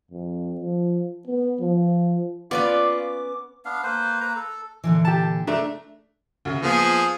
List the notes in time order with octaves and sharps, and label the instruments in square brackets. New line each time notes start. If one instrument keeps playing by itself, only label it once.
[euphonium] F2
F3
B3
F3
[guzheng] B3 C#4 B4 [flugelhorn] F4 [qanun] D5 [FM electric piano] D6
[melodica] B3 D4 F5
A#3 B4 C5
A#3 B4 A#5
A4
[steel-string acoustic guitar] A#2 D3 E3
[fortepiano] G4 A5
[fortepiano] A3 D4 [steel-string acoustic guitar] A#5
[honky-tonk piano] D2 C#3
[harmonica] F3 G#4 [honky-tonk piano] A#3 B3